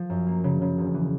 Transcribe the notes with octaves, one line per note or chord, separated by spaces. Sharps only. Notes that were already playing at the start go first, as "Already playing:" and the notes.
Already playing: F3
F#2
A#3
C#3
C#3
E1
E3